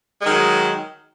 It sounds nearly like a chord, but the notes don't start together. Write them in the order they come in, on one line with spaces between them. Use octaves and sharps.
G#3 D#3 F#3